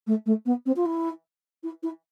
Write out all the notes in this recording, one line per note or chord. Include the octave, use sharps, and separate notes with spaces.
A3
A3
B3
C4
F4
E4
E4
E4